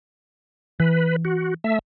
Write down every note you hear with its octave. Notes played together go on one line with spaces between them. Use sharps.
E3 B4
F#4
A3 E5